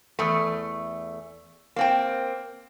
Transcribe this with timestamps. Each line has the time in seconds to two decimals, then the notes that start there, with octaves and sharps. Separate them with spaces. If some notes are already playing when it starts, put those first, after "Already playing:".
0.19 E2 A3
1.76 A#3 C4 G5